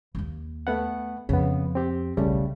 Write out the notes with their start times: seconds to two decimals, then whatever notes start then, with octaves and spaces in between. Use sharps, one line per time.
0.15 D#2 A#3
0.67 A3 B3 F#5
1.29 F2 C#3 B3
1.75 C4 G4
2.17 D#1 B1 C#3 G3 A3